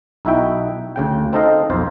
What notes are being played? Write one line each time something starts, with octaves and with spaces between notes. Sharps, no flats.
B1 D#4 E4 F#4 E5 G5
D2 C#3 G5
C4 D#4 A4 C5 D#5 F5
B1 F2 F4 C5